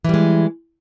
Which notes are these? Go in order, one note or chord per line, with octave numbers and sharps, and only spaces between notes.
E3 G3 G#3